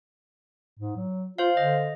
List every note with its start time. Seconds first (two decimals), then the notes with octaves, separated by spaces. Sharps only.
0.80 G#2
0.97 F#3
1.38 F4 C5 F5
1.57 D3 D#5